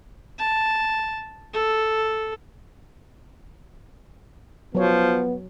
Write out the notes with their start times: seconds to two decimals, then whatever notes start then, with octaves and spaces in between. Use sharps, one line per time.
0.39 A5
1.53 A4
4.75 F3 F#3 B3 C#5